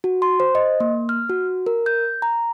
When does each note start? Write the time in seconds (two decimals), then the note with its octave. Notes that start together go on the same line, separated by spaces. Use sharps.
0.04 F#4
0.22 C6
0.40 C5
0.55 D#5
0.80 A#3
1.09 F6
1.29 F#4
1.67 A#4
1.86 G6
2.22 A#5